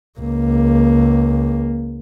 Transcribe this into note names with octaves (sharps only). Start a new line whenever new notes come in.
C#2 A#3